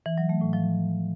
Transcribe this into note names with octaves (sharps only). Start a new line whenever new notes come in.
E3
F#3
A3
A2
F3